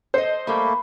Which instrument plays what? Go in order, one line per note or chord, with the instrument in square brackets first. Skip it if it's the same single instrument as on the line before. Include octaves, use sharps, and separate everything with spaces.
[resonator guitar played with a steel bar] A4 D#5 [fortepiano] C5
[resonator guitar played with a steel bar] G3 G4 [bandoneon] A3 A#3 [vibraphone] B5